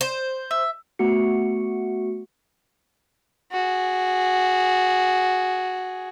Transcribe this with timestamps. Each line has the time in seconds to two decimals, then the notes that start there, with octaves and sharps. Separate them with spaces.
0.01 C5
0.51 E5
0.99 A3 B3 F#4 C#7
3.52 F#4 G#4